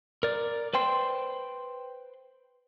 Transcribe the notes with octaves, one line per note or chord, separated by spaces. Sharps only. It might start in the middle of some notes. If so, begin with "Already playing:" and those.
A#4 D5
B4 C5 G5 C6